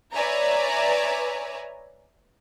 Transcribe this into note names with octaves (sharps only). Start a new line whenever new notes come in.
B4 C#5 D5 E5 G#5 A#5